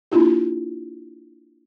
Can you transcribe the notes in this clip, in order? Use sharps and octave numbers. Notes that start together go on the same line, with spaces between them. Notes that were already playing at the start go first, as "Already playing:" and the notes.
A#3 D4 E4 F4 G4